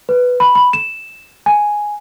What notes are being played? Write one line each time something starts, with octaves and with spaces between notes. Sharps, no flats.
B4
B5
B5
E7
G#5